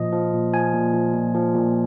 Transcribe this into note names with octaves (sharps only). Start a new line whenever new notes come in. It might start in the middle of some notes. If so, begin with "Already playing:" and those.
Already playing: A#2 F3 D#5
F3
A#2
F3 G#5
A#2
F3
A#2
F3
A#2